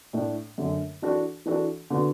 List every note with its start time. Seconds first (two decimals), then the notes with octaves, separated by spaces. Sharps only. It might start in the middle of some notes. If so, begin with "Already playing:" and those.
0.13 A2 A3 D4 A4
0.58 F#2 D3 A3
1.02 E3 D4 F#4 A4
1.46 E3 D4 F#4 A4
1.90 D3 B3 F#4